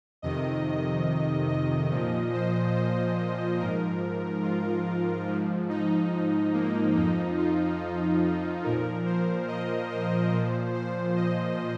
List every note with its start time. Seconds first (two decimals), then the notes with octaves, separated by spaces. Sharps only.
0.22 F2 C3 D#3 D#5
1.48 D#5
1.91 A#2 F3
2.33 C5
2.75 C5
3.59 G#2 F3 A#4
4.43 F4
5.27 G#2 F3
5.69 D#4
6.53 A#3
6.95 F2 F3 D#4
7.38 F4
8.64 A#2 F3 A#4
9.06 C5
9.48 D#5
9.90 C5
10.32 A#2 F3
10.74 C5
11.16 D#5